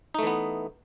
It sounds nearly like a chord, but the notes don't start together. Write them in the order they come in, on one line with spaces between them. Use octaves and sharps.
D#4 A3 E3 B3